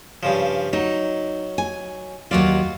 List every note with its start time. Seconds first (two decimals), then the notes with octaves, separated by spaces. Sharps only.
0.23 G2 C#3 F3
0.73 F#3 D#4
1.58 G#5
2.31 D#2 F#3 F4 F#4 D5